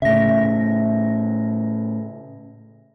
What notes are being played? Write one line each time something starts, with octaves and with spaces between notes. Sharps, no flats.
A2 C#3 E5 A#6